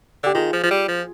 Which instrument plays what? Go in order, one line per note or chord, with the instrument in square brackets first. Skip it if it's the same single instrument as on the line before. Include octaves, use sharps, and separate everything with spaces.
[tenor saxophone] D3 [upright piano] G4
[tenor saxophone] D#3 [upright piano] F4 G#4
[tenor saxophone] F3
F3
G3
F3